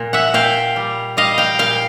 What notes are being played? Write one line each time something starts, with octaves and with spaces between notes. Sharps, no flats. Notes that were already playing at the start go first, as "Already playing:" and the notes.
Already playing: A#2
E5 F#5
A#2 F5 G5
G3
G3 D#5 F5
F5 G5
A#2 F5 G5